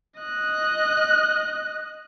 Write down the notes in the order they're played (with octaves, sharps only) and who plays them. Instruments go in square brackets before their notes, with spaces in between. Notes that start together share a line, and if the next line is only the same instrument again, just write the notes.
[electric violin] D#5 F#6